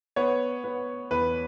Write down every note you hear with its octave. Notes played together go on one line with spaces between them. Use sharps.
B3 C#5
B3
E2 B4